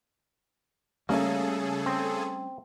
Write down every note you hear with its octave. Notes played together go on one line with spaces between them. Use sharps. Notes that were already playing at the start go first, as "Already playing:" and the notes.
C#3 G3 A3 A#3 C#4 G#4 A4 F5
C4